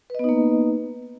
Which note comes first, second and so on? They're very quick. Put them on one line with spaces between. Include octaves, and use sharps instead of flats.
B4 D#5 B3 D#4 A#3